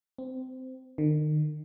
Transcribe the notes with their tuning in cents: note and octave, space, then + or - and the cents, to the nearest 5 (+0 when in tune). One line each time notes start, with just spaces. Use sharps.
C4 -20
D#3 -40